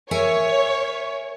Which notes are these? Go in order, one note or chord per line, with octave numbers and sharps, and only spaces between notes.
A#4 C#5 E5 G#5